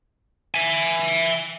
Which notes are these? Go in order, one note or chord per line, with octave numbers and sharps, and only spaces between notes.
E5 G#5